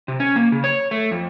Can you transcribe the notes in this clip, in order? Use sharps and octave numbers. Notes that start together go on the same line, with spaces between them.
C3
C#4
A#3
C#3
C#5
A3
F2